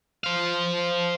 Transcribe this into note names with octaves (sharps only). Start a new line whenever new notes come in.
C5 F5